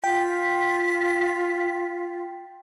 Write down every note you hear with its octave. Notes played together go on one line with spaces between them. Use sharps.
F4 G5 B6